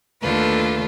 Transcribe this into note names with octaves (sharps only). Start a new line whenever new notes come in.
D#2 D3 A3 F4 B4